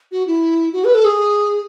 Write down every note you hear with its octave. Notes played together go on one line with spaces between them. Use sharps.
F#4
E4
F#4
B4
A4
G#4